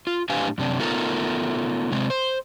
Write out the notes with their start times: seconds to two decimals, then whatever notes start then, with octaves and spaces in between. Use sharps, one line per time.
0.07 F4
0.30 A2 D4 G4 B4 F5 G#5
0.58 F#2 C3 D4
0.79 A3 B3 D#4 F4 A4 A#4
1.92 C3 G#3 C4
2.10 C5